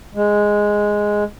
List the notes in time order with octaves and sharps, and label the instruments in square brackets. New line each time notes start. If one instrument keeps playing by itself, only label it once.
[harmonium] G#3